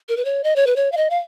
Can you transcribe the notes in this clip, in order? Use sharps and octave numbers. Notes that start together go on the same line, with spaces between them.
A#4
B4
C#5
D#5
C#5
B4
C#5
F5
D#5
F5